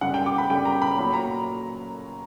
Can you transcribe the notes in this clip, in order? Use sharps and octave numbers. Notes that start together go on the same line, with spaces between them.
F#2 C#3 G3 F#5
G5
D6
B5
F#2 C#3 G3 G5
A#5
B5
A#2 F#3 B5
A#5